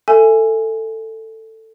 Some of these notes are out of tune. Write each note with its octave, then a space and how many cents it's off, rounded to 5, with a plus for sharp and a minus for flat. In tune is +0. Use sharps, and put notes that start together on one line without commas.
A4 +15 E5 +0 G#5 +0